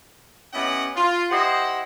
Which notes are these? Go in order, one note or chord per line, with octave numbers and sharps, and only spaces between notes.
B3 C#4 E4 G4 D#5 F#5
F4
E4 G4 C5 D#5 F#5